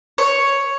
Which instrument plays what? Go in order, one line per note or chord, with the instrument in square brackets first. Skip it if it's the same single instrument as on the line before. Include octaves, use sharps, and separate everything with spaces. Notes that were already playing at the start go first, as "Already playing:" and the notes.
[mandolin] C#5